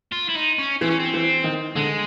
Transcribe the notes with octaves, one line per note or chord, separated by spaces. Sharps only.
F4
E4
D#4
C#4
E3 C4
C#4
C4
E3
D#3
D3 G#3